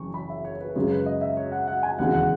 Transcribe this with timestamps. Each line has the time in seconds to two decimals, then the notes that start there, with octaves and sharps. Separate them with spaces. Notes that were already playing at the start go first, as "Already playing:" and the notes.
Already playing: F#1 F#2 E3 C#6
0.14 B5
0.30 E5
0.45 C#5
0.60 B4
0.76 F#2 C#3 G#3 C#5
0.91 B4
1.06 D#5
1.21 E5
1.37 C#5
1.52 F#5
1.68 F#5
1.83 G#5
1.99 E1 D#2 C#3 E3 F#5
2.13 F#5